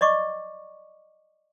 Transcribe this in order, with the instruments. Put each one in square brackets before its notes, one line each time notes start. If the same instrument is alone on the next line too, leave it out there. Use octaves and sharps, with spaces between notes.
[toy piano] D5 D#5 C#6 D6